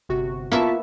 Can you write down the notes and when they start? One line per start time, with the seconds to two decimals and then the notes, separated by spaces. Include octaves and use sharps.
0.09 G1 C3 F#4
0.52 A#3 B3 E4 F4 E5 A5 C#6 B6